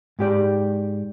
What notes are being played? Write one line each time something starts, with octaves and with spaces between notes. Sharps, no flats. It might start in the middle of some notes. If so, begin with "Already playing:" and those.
G#2 G4 D5